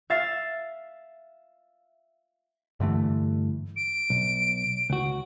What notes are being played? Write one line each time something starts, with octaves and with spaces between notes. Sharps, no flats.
E5 F5 A6 C7
G2 D3 E3 A3
D7
B1
C#2 F#4